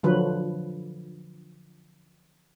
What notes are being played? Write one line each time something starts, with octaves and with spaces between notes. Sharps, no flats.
D3 F3 F#3 B4